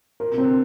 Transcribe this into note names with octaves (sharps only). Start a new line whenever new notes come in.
A#2 A#4
C3
C4
D3